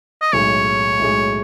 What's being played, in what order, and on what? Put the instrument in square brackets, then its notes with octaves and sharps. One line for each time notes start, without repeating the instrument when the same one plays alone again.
[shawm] D#5
[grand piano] B1 A2 G#3 [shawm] C#5
[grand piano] B1 A2 G#3